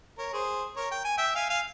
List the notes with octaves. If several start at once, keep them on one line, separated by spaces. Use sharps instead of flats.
A#4 C#5
G#4 C5
A#4 C#5
G5
G#5
E5 G5
F5 G#5
F5 G#5